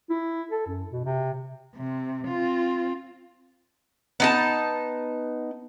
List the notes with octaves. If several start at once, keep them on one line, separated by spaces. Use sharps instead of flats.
E4
A4
F#2
B2
C3
C3
C4 F4
B3 D#4 A5